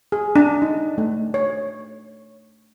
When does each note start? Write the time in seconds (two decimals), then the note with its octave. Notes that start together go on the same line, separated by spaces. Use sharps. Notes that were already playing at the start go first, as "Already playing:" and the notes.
0.12 G#4
0.36 D4
0.62 D#4
0.98 A3
1.34 C#5